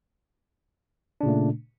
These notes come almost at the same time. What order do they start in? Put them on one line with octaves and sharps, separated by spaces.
D4 C#3 A#2 A3